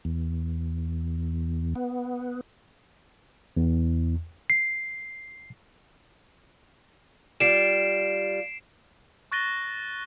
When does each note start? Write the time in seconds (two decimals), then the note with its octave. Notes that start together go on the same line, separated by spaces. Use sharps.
0.05 E2
1.75 B3
3.57 E2
4.50 C7
7.40 G3 F4 C7 D7 E7
9.32 C#6 F#6 A6 A#6 D#7 G7